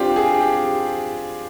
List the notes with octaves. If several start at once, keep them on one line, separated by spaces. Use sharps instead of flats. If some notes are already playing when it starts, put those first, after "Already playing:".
Already playing: C4 D4 F4 G4
G#4
G4